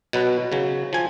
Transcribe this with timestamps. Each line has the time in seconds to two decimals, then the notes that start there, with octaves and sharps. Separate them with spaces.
0.13 B2 F#3 B4
0.52 C#3 F#3
0.93 F3 G#5